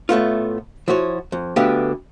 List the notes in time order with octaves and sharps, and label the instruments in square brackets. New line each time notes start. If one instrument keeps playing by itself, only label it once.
[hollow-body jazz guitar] A2 A3 B3 F4
F3 E4 F#4 C#5
F2
D2 D3 B3 G4 E5 F5